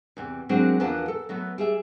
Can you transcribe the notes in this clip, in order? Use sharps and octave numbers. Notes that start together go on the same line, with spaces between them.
E2 C3
F#3 G#3 A#3 C4 D4
E2 F3 A#3 B3 D4 A5
A4
F#3 A3 B3
G3 G#4 E5